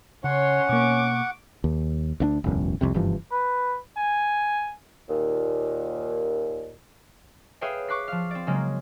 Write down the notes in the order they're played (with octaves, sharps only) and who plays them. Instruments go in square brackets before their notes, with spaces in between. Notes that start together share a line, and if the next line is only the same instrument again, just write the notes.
[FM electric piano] C#3 [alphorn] C#4 [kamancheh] C#5 C6 [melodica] F#5
[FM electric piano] B2 A#3 [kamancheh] C#6 D6
[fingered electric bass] D#2
D2 A#3 D4
E1 C#2 F#2
C2 F2 C3
F#1 G2 E3 F3
[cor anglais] B4
G#5
[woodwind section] D#2 A#2
[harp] G#4 B4 C#5 E5 F5 G5
C#6 D6 F#6 B6 C7
F3 F5
C4 D5
C#3 F#3 G#3 A#3